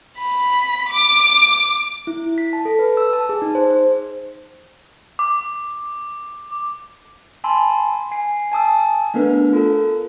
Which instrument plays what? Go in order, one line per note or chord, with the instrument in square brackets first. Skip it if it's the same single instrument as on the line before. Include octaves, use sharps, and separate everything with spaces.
[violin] B5
D6
[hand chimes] E4
B6
A5
A4
B4
E6
A5
G#4
D#4
C5
C5
[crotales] D6
[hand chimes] G#5 A5 B5 C6 E6
G#5 C7
G#5 A5 D#6 E6
A3 B3 D4 A#4 B4
F4 A4 A#4